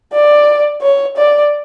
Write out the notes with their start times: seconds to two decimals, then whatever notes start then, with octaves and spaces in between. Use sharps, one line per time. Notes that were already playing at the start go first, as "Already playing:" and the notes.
0.13 D5
0.82 C#5
1.17 D5